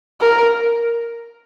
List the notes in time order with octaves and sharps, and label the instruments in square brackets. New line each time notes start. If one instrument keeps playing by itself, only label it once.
[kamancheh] A#4